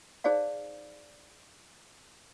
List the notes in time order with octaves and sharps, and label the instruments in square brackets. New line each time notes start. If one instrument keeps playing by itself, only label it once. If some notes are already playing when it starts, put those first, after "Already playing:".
[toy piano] D#4 G#4 C5 D5 F5